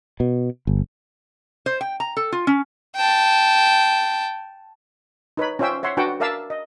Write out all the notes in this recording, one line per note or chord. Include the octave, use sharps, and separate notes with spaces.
B2
G1
C5
G5
A#5
A4
F4
C#4
G5 A5
D#4 B4 C#5 B5
C#4 F4 C5 E5 G5 E6
C#5 E5 F#5 C6
D4 F#4 B4 F#5 G5 A5
A#4 D5 E5 F5 A5 E6
D#5